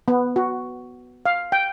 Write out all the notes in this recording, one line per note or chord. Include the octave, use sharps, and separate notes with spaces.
B3
F#4
F5
G5